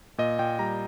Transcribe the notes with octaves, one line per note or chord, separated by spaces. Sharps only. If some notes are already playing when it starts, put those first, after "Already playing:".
A#2 D#5
A#2 G5
G3 A#5